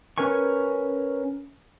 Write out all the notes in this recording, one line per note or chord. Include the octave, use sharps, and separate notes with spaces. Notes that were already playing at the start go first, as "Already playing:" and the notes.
C#4 A#4 B4 G#5 C#6